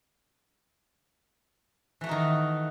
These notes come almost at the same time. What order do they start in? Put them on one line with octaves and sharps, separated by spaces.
E3 A3 F#4 D#4 D#3